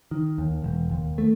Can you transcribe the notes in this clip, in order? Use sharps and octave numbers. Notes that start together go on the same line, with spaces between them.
D#3
D#2
E1
D#2
A3